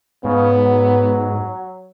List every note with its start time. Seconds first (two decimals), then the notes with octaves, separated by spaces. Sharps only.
0.24 G#2 C#3 B3
0.59 F#3